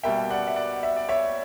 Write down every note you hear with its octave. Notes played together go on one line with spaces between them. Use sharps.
B2 G3 A#3 E5 G5
D5 F#5
E5
D5 F#5
E5
D5
C#5 E5